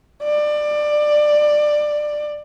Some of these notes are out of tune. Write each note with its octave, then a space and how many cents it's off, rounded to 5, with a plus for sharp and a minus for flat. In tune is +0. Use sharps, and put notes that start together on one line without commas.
D5 +20